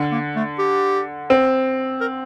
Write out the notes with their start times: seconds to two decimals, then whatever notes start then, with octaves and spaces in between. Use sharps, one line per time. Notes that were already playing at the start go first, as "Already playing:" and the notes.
Already playing: D3
0.12 A#3
0.36 A3
0.59 G4
1.30 C4
2.01 A#4